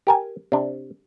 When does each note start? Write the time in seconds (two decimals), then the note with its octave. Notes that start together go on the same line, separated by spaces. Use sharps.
0.07 G4 A#4 G#5
0.52 C3 D4